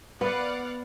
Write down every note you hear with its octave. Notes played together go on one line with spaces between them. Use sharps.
B3 B4 D5 F5 F#5